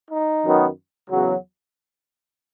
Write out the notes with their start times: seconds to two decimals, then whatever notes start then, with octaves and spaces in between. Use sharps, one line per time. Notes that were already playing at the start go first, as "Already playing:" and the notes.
0.10 D#4
0.45 F#2 D#3 F#3 B3
1.10 E2 C#3 F#3